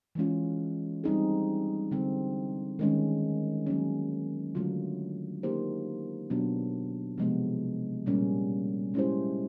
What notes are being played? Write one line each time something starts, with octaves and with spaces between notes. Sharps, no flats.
E3 G#3 C#4 F4
G3 C4 D#4 G#4
D3 G3 C4
D#3 G#3 C#4
F#3 A#3 C#4
D3 F#3 A3 C#4 F4
A#3 D#4 G4 C5
B2 F#3 B3 D4
C3 F3 G#3 B3
A#2 G3 A#3 C#4
G#3 C#4 E4 G4 C5